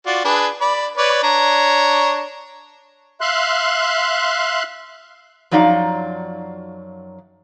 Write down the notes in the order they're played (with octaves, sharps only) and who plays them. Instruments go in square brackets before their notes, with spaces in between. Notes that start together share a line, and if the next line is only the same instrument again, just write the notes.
[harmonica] F4 F#4 D5
D4 G#4 B4
D5 B5
B4 C#5 D5
D4 C#5 A#5
[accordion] E5 F5 C6 F#6
[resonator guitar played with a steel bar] F#2 F3 F#3 D#4 D5 F5